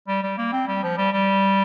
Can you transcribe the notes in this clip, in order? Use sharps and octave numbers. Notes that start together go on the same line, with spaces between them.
G3
G3
A#3
C4
G3
F3
G3
G3